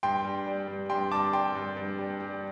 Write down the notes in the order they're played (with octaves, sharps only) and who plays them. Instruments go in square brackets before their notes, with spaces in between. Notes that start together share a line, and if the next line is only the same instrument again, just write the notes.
[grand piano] G2 G5 C6
G3
G3
G2
G2 G5 C6
G3 A5 D6
G3 G5 C6
G2
G2
G3
G3